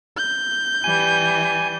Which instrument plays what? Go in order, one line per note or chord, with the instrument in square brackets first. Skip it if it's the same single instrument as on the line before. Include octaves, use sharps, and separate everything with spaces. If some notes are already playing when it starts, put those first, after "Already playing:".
[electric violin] G6
[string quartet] E3 G3 [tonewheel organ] G#5